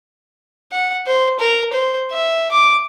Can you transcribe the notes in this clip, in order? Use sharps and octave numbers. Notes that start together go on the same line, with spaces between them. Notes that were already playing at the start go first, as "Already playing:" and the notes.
F#5
C5
A#4
C5
E5
D6